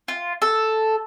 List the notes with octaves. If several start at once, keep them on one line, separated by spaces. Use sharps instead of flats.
F4
A4